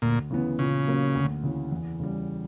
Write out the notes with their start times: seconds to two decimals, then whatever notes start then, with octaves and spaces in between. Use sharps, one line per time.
0.02 D2 A#2
0.31 C#3 E3 B3
0.58 A#2 C#3
0.86 F#3 A#3 C#4
1.15 D2
1.43 C#3 E3
1.71 E2
2.00 C#3 G3